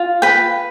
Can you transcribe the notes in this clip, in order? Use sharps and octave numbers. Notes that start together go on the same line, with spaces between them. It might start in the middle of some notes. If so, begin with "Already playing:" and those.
Already playing: F4
B4 G5